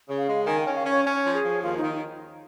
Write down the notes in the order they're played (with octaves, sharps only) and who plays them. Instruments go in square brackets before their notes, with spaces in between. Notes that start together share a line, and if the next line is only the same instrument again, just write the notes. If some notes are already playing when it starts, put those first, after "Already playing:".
[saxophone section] C#3
[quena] F5
[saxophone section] G#3
[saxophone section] D#3 [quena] G#5
[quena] G5
[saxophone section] C#4
[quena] F5
[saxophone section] C#4
[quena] C#5
[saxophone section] C#4 [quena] C#5
[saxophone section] F3
[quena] G#4
[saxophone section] F3
[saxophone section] D#2 [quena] F4
[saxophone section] D#3 [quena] D#4